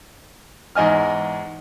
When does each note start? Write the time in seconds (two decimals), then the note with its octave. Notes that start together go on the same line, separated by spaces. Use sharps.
0.75 E2 G#2 D#5 G#5 F6